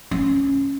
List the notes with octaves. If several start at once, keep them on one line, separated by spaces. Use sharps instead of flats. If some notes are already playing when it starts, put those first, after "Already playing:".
C#4